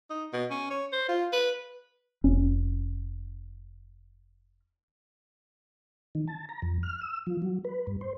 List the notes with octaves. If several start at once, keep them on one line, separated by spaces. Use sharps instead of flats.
D#4
B2
C#4
C#5
C5
F4
B4
F1 C#4
D#3
A5
A#5
F2
F6
E6
F3
F#3
B4
G2
C5